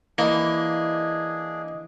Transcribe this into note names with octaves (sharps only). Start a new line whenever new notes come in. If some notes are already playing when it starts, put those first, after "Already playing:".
E3 A#3 D4 G#4 D#5